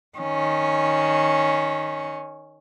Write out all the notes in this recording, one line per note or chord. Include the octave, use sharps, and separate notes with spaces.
D#3 C#4